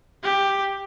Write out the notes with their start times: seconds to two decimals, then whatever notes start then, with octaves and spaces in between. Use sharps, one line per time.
0.23 G4